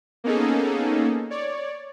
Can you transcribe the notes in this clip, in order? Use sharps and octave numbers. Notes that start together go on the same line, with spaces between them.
A#3 B3 C#4 D#4 G#4 A4
C#5 D5